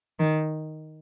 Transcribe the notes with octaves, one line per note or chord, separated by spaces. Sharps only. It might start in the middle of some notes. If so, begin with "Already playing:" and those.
D#3